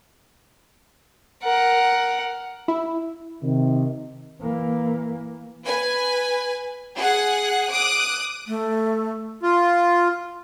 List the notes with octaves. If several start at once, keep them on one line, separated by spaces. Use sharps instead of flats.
A#4 F#5
E4
C3 D#3
E3 A#3
B4 G#5
G#4 F#5 F#6
D6 D#6 F#6
A3
F4